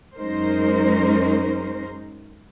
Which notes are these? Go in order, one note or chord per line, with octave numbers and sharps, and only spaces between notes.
F#2 G#3 C#4 D#4 A#4 C5